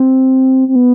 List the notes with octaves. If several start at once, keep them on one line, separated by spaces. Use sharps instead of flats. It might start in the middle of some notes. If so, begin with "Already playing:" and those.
Already playing: C4
C4
B3